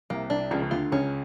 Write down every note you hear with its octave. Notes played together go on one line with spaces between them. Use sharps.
C2 C3 A#3
C2 C3 D4
C#2 C#3 F3
C#3
D2 D3 F4
C#2 C#3 C#4